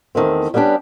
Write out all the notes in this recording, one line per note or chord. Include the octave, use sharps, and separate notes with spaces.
E2 D#3 A3 C4
G3 B3 C#4 D4 G4